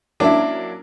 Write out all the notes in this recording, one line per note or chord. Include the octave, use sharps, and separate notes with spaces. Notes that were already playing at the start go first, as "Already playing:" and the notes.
F#3 A#3 C#4 D4 E4